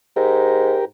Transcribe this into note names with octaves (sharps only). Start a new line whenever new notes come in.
G#2 G4 A#4